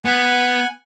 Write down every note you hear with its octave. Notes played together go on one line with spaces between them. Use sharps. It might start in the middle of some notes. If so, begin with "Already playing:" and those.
B3 F#5 G#5